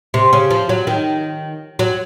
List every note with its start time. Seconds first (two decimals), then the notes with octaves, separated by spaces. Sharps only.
0.14 C3
0.33 C#3
0.50 F3
0.69 F#3
0.87 D#3
1.79 F#3